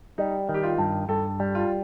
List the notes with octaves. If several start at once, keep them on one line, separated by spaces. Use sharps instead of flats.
G3 D#4
D#3
G4
F4
G2
G2 A4
G3
F4